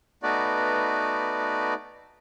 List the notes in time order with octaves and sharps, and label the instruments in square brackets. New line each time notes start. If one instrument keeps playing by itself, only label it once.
[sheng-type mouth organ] A3 B3 D#4 F#4 B4 D5